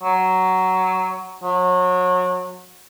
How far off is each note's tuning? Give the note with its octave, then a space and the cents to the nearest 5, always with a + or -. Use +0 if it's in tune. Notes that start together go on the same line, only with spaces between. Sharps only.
F#3 +10
F#3 -30